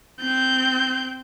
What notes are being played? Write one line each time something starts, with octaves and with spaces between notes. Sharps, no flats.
C4 G6